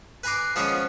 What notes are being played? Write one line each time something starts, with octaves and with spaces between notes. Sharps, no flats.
B4 G#5 A#5 C6 D6
F3 G#3 B3 C#4 B4 C#5